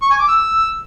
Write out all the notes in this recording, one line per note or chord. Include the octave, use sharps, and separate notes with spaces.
C#6
G#5
D6
E6